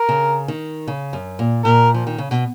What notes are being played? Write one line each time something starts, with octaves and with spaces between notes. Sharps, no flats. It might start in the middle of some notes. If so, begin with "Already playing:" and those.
Already playing: A#4
C#3
D#3
C#3
F#2
A#2
A#2 A#4
F3
D#3
C#3
B2